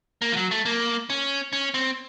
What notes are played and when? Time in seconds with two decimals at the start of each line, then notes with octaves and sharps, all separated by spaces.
0.22 A#3
0.32 F3
0.37 F#3
0.51 A3
0.65 A#3
1.10 C#4
1.53 C#4
1.74 C4